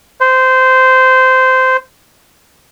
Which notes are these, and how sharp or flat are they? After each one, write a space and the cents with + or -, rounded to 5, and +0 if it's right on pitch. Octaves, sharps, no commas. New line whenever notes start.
C5 -15